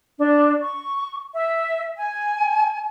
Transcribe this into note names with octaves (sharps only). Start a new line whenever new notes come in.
D4
C#6
E5
G#5